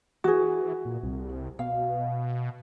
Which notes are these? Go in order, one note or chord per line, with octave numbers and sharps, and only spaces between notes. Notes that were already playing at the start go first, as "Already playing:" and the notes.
E3 F#4 G#4
A#2
C2
B2 F5